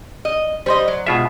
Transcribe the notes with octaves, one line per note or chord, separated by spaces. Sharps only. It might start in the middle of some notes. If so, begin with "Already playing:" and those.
D#5
G3 C5 D#5 C6
F#3
B2 G#3 F4 E5